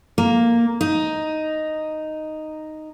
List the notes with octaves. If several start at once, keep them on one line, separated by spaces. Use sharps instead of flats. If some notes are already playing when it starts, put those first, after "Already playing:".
A#3
D#4